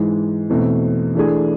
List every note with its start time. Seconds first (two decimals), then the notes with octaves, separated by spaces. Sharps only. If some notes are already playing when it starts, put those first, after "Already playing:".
Already playing: G#2 E3 G#3
0.49 E2 B2 A3 C4
1.15 E3 A3 D4 G#4